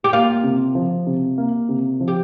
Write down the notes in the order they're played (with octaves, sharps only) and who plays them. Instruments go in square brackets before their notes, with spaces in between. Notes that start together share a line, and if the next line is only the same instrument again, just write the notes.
[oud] G4
[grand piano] A#3 [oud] F4
[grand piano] C3
F3
C3
A#3
C3
F3
[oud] G4